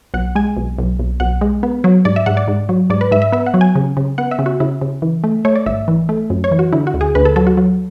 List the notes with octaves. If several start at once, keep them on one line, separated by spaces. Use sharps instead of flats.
B1 F#5
G#3 G#5
B1
B1
B1
B1 F#5
G#3
B3
F#3
G#2 D5
E5
G#2 F#5
D5
G#2
F#3
G#2 D5
B4
G#2 E5
E5
B3 E5
F#5
F#3
G#5
C#3
C#3
B3 F#5
E5
C#3
F#4
C#3 E4
C#3
E3
A3
A3 C#5
D5
G#1 E5
E3
A3
F#2
C#5
E3
F#4
D3 E4
F#4
D2
G#4
D2 B4
A4
F#3 A4
F#4
F#3